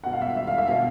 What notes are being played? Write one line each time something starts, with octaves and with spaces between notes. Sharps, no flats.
B2 F#5
F5
E5
E5
F5
E5
B2 F5